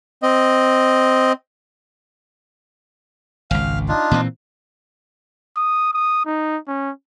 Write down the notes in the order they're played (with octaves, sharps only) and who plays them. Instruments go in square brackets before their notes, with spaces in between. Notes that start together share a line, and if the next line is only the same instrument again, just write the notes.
[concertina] C4 D#5
[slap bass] G#1 C#2 [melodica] F5
[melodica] D4 D#4 F4
[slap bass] A#2 E3 C4
[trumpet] D#6
D#6
D#4
C#4